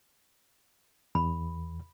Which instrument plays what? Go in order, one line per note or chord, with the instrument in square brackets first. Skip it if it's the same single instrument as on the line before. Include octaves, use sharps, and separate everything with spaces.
[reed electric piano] E2 [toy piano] B5